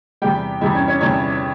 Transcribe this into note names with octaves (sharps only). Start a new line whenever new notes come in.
E2 C3 G3 G4 G5
E2 C3 G3 E4 E5
C#4 C#5
C#4 C#5
E2 C3 G3 C#4 C#5